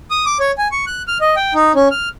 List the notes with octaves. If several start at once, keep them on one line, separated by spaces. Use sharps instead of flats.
D#6
D6
C#5
G#5
C#6
F#6
F6
D#5
G5
D#4
C#4
F6